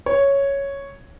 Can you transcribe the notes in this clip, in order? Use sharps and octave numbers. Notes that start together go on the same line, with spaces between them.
C#5